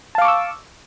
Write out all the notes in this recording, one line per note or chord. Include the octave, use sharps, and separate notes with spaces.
F5 A5 C#6 D6 E6